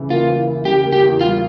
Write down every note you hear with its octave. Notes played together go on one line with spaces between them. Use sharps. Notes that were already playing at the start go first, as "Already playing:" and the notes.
Already playing: C#3 E3 E4
A#3 F4
E3
E4
C#3 G4
A#3
G4
E2
G3 F4